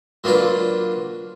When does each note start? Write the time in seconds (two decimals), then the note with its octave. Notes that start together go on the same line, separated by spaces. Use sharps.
0.24 F#3 A#3 D4 F4 B4